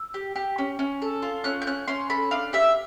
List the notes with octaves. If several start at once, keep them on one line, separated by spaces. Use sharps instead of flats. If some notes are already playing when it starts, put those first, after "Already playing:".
Already playing: E6
G4
G4
C#4
C#4
A4
F4
C#4 F#6
G6
C#4 F#6
C#4 C6
A4 B5
D4 F5
G4 E5